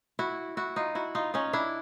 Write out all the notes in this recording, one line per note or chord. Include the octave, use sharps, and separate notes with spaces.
E4 F#4
E4 F#4
D#4 F4
E4 F#4
D#4 F4
C#4 D#4
D4 E4